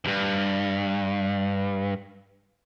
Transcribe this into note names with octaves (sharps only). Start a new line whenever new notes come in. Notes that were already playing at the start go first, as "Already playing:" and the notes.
D2 G2